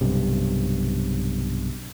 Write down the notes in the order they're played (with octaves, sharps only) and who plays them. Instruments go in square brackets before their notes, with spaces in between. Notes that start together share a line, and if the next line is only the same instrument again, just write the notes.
[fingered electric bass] B1 G2 C3